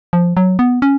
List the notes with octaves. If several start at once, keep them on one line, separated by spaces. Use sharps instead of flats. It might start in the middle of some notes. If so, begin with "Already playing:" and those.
F3
F#3
B3
C#4